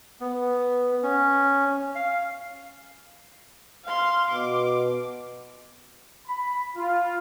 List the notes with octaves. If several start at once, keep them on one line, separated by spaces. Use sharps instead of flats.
B3
C#4
F5
F5 C6
B2 D6
B5
F4